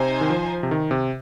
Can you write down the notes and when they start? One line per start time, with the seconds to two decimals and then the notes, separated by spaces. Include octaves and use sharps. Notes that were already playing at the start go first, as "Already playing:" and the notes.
Already playing: C3 D#4 C5 G#5
0.21 D#3
0.30 F3
0.63 C3
0.71 D#3
0.91 C3